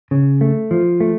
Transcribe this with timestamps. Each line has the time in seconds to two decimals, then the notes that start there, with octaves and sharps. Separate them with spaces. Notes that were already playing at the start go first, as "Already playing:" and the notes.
0.11 C#3
0.41 A3
0.71 F3
1.00 A3